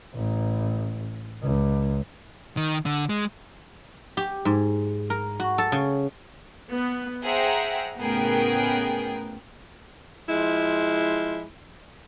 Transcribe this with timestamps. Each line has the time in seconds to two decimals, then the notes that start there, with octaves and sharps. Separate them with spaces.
0.15 A1
1.43 C#2
2.57 D#3
2.86 D3
3.09 G#3
4.17 G4
4.45 G#2
5.10 A#4
5.40 F#4
5.58 A4
5.72 C#3
6.70 B3
7.24 G#4 C5 E5 F#5 G5 A#5
7.99 A2 C#3 B3 G#4 A#4 G5
10.28 F3 G#3 E4